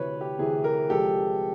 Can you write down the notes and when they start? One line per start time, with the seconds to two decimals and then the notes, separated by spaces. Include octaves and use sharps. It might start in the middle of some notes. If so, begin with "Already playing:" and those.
Already playing: D2 C3 E3 B4 C#5
0.21 G4
0.39 D2 C3 E3 G#4
0.64 G#4 A#4
0.90 C2 C3 F3 G#3 G4 A4